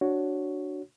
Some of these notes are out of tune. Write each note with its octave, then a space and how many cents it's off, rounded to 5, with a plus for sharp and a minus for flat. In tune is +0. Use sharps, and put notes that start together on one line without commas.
D4 +0 F#4 +0 C#5 +0